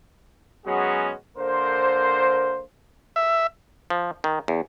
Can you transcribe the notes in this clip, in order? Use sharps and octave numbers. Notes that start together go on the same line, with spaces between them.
F#3 G#3 B3 C#4 F#4 G#4
D3 A#3 A#4 C5
E5
F3
D#3
E2